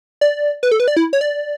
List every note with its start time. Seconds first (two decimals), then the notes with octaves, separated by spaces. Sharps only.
0.21 D5
0.63 B4
0.71 A4
0.80 B4
0.88 D5
0.97 E4
1.13 C#5
1.21 D5